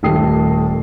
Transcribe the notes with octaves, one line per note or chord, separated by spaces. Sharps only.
D#1 D#2 A3 G5 D#6 C7